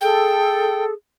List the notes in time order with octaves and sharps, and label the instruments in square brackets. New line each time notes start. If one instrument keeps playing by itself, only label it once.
[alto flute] G#4 [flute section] A4 [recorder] G5